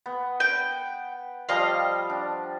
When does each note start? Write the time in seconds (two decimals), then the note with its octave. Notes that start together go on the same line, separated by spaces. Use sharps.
0.06 B3
0.40 F#5 G5
1.49 F3 G3 D#5 F5 A5
2.10 D4